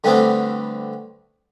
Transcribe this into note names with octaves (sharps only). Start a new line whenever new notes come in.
D3 G3 A3 B3 C4 D4